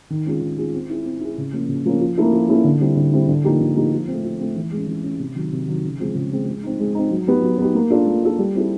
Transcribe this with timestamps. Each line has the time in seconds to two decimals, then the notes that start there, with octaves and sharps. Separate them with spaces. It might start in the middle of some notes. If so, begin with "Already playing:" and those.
0.10 D#3
0.26 G#3 C#4 F4 G#4
0.42 D#3
0.57 G#3 C#4 F4 G#4
0.74 C4
0.90 E4 G#4
1.05 C4
1.21 E4 G#4
1.38 C#3
1.53 F3 A#3 C#4
1.69 C#3
1.86 F3 A#3 C#4
2.00 F3
2.18 A#3 C#4 E4 A4
2.33 F3
2.49 A#3 C#4 E4 A4
2.64 D3
2.81 G3 C4 E4
2.96 D3
3.13 G3 C4 E4
3.28 D3
3.44 F3 A#3 D#4 G4
3.61 D3
3.76 F3 A#3 D#4 G4
3.92 F3
4.08 C4
4.13 A3
4.24 F3
4.40 A3 C4
4.56 E3
4.71 G#3
4.77 C#4
4.87 E3
5.03 C#4
5.08 G#3
5.19 C3
5.36 D#3 F#3
5.52 C3
5.67 D#3 F#3
5.84 C#3
6.00 F3 G#3 C4
6.15 C#3
6.31 F3 G#3 C4
6.47 G#3
6.63 C4 D#4
6.79 G#3
6.95 C4 D#4
7.11 F#3
7.27 B3 D#4 G4
7.43 F#3
7.58 B3 D#4 G4
7.75 A#3
7.90 D4 F4 A4
8.07 A#3
8.23 D4 F4 A4
8.39 G3
8.55 C4 E4 A4